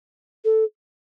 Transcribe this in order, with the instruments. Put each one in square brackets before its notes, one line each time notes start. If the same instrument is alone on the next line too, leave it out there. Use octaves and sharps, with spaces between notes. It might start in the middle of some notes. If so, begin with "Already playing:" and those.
[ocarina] A4